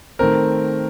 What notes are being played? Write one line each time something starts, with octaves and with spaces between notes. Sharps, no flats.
D#3 A3 C4 A#4